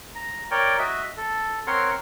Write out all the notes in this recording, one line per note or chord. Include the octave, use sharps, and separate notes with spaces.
A#5
A#4 C#5 D5 G5
F#4 D#5 E5
A4
C4 A#4 C#5 F#5 C6